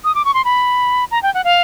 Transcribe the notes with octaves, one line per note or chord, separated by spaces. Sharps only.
D#6
D6
C#6
C6
B5
A#5
G5
F#5
F5